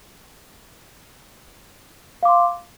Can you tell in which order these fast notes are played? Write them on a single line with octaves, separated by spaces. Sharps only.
F5 D6 C6